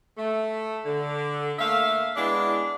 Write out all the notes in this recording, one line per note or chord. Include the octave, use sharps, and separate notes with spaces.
A3
D3
A3 A#3 E5 F5
G#3 B3 D4 E4